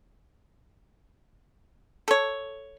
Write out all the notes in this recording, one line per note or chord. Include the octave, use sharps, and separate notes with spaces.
A4 C#5